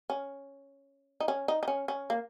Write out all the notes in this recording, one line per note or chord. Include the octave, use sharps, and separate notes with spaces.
C#4
D#4
C#4
D#4
D#4
C#4
C#4
A#3